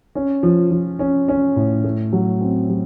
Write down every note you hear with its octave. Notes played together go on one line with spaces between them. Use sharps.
C#4
F3
F3
C#4
C#4
A2
A3
F#3
C4
F#3